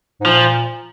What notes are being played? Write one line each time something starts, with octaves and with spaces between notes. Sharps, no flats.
G#2
A#2 F3